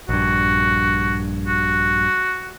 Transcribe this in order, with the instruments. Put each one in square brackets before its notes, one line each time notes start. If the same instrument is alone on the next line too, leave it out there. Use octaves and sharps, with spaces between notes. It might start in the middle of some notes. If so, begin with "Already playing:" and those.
[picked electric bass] A#1 G2 [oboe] F#4
[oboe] F#4